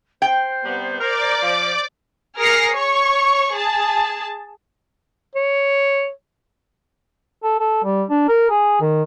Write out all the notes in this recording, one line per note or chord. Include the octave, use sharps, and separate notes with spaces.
C5 G5
C3 G3 B3
A#4 D5 D6
F3
G#4 A#4 F6 A#6 C7 C#7
C#5 C#6
G#4 A5
C#5
A4
A4
G3
D4
A#4
G#4
D#3